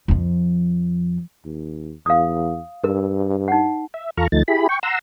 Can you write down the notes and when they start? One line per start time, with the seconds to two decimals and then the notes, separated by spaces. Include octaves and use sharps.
0.08 F2 F3
1.45 D#2
2.06 E2 F5 D#6
2.84 G2 A#4
3.48 D#4 F#5
3.94 E5
4.17 E2 F4 A4 A#5 C#6 F6
4.32 D2 F3 A3 D#4 A6
4.48 E4 G4 G#4 B5
4.69 G5 C#6
4.83 F#5 A#5 C6 E6